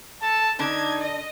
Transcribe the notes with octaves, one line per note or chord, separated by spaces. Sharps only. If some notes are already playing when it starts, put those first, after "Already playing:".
A4 A5
D3 D4 D#4 G#6
D#5